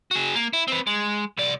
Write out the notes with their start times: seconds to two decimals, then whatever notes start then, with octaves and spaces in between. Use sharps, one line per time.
0.11 F#4 G#4
0.35 A#3
0.53 E4
0.68 C4 B4
0.87 G#3
1.38 C2 D5